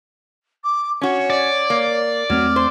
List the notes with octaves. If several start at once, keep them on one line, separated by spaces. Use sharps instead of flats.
D6
C#4 F#4 C#5
D5
A#3
E2 F#3 A3 C4 F6
C5